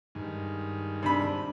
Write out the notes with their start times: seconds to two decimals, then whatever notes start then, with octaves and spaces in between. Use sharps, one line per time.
0.15 G2 D#3 G#3
1.03 C3 D4 B5